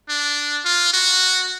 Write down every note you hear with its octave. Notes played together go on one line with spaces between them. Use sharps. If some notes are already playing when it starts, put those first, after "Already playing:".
D4
F4
F#4